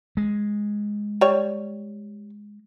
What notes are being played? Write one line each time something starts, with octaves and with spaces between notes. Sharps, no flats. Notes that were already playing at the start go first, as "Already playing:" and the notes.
G#3
G3 C#5